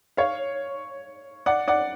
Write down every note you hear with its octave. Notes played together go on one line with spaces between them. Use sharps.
C#5 F5
D5 F#5
D5 F#5